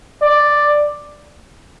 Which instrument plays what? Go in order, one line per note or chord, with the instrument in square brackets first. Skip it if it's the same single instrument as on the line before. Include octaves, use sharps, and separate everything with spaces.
[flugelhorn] D5